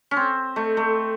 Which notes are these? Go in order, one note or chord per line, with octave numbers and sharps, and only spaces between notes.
C#4
C4
A3
A3